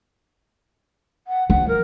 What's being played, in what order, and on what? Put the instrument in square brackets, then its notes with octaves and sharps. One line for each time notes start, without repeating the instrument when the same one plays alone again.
[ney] F#5
[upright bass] F3 [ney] F#5
[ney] A#4